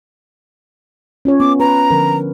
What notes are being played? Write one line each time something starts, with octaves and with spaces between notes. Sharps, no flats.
C#4 F4 C#5
B3 D6
B4 A#5
D3 F3 A#4